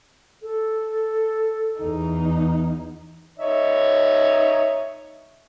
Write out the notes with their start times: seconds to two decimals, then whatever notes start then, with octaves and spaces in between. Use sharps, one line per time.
0.42 A4
1.80 E2 D#4
3.39 D#4 C#5 E5